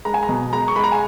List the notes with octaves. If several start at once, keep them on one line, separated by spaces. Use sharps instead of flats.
G#3 A#5
G#5
A#5
B2
G#3 A#5
C#6
G#3 B5
A#5
G#5